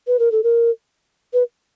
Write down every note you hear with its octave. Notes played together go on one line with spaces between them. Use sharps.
B4
A#4
A4
A#4
B4